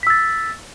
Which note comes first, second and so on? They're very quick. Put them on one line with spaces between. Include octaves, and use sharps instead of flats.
B6 E6 A6